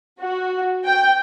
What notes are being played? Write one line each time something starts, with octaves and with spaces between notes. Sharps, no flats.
F#4
G5